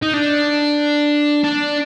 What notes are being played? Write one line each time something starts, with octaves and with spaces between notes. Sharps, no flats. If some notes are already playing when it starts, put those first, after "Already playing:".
D#4
D4
D4